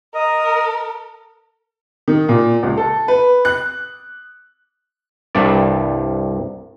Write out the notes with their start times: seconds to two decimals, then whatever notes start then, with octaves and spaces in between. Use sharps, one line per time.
0.15 A#4 D#5
2.08 D#3
2.29 A#2
2.63 C#2
2.77 A4
3.08 B4
3.45 F#6
5.35 C2 G2 D5